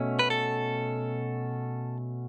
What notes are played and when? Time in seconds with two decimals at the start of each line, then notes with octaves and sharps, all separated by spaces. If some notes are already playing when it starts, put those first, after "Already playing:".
Already playing: B2 A3 C#4
0.19 B4
0.30 A4